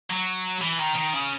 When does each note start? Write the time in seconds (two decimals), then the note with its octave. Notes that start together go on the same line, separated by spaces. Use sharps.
0.10 F#3
0.62 E3
0.79 D#3
0.96 D#3
1.14 C#3